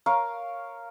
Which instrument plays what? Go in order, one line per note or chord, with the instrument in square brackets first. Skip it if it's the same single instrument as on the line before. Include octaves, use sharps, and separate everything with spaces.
[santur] A#4 C#5 F5